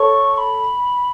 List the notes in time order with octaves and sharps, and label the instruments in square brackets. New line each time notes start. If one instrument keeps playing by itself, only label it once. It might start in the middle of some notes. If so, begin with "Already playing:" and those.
Already playing: [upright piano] A4 C#5 [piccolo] C#6
[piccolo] B5